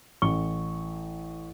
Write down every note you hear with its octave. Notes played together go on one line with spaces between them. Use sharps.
A1 C#6 G7